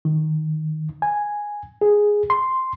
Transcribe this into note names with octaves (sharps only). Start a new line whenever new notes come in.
D#3
G#5
G#4
C6